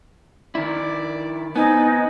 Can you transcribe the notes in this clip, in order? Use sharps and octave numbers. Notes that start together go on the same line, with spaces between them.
D#3 E4 D5
B3 C4 D#4 G#5